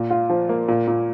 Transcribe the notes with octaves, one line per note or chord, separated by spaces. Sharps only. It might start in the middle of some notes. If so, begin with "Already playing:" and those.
Already playing: A#2
F4
F3
A#3
A#2
A#2